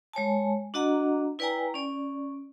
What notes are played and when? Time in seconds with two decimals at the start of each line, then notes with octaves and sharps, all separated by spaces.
0.13 G#3 C#5 G#5 A5
0.74 D4 F#4 D#5 F#5 A#5
1.39 E4 B4 D5 G5 G#5 A#5
1.74 C#4 D5